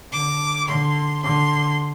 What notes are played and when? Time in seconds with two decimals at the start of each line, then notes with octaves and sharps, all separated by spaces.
0.12 D3 D6
0.68 D3 C6
1.23 D3 C6